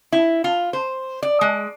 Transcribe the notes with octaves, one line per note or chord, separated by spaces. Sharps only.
E4
F4
C5
D5
G#3